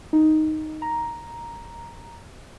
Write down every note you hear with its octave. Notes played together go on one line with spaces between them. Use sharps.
D#4
A#5